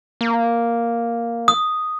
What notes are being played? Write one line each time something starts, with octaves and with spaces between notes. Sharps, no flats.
A#3
D#6